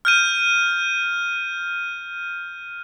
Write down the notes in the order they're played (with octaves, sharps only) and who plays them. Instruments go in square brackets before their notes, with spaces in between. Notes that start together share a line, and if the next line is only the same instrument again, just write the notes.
[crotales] F6 G6 D#7